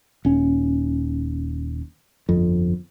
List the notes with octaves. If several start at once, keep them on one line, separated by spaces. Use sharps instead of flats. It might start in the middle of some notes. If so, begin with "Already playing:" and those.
D#1 C#4
G1 F2